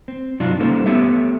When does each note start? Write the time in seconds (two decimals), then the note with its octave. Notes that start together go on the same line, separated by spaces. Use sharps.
0.08 C4
0.40 G2 C3 F#3 D4 D#4 F4
0.59 G3 A#3 C#4 D#4 A4 C5
0.86 A3 B3 G4 A4 C#5 E5